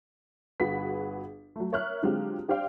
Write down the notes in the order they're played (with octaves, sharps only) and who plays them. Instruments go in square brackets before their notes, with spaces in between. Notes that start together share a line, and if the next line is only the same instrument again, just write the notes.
[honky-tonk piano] G1 F#4 G#4 B4 B6
F#3 A3
A#4 C#5 E5 F6 F#6
D3 F#3 G#3 C4 F4 G4
D4 G4 C5 D5 F5 G5